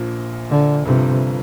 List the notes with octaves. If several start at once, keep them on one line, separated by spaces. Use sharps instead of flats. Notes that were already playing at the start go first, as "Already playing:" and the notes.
Already playing: A#1 A#2 F3 A#3
D3
G1 G2 C3 F3